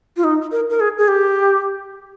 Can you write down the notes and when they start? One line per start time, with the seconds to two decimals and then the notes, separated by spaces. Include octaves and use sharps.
0.17 F4
0.24 D#4
0.52 A#4
0.70 A#4
0.80 G#4
0.98 G#4
1.08 G4